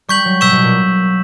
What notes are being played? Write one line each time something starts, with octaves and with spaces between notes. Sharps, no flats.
G3 C#6 G6 B6 F#7
F#3
B2 C#6 E6 G6 B6 E7
B2
A#2